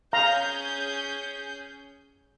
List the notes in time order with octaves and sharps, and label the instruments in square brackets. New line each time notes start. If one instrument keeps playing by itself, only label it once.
[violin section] C#4 G#4 G6 [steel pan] F5 A#5